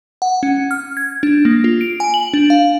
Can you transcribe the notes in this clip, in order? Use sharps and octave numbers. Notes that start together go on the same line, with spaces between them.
F#5
C#4
F6
G#6
D4
A#3
F4
D7
G#5
F#7
D4
F5